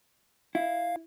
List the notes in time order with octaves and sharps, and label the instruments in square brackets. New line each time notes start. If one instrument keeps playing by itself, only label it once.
[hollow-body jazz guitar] E4 [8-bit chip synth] F5